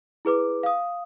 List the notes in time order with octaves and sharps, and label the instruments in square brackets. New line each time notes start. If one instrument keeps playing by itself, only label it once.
[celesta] E4 G#4 B4 D6
F5 D#6